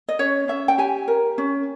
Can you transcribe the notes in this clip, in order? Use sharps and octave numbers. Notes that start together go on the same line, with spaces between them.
D#5
C#4 C#5
C#4 E5
G5
G4 G#5
A#4
C#4